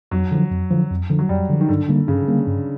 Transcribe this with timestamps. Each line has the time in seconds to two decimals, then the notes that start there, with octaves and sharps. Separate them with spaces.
0.11 F2 F#3
0.31 D3 F3
0.51 F2
0.71 D3 F3
0.91 F2
1.10 D3 F3
1.19 F#3
1.29 F2 G3
1.50 D3 F3
1.61 D#3
1.69 G2 D3
1.89 D3 G3 A#3
2.08 G2 C#3
2.28 D3 G3 A#3
2.47 G2